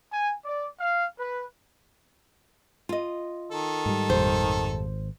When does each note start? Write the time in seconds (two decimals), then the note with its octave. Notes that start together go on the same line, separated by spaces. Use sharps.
0.13 G#5
0.45 D5
0.80 F5
1.19 B4
2.89 F4 D#5
3.52 D#3 A4
3.86 G#2 G3
4.10 G#1 F2 A#2 G3 C5